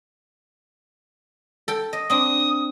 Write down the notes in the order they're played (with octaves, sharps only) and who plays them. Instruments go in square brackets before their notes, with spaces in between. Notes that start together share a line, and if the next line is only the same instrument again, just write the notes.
[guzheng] A4 G5
D#5
[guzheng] C4 D4 [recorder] D#6